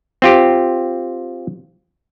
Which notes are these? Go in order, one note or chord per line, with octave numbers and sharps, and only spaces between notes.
C4 F4 G4